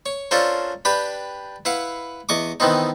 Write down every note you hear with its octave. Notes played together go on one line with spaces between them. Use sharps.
C#5
C#4 D4 F4 A4 A#4 C5
D4 G4 B4 G5 B5
E4 B4 F5 F#5
E2 D#5 C#6 D6
D#3 E3 B3 C4 D#4